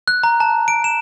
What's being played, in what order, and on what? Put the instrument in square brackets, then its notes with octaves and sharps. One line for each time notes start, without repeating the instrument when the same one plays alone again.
[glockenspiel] F#6
A#5
A5
D7
E7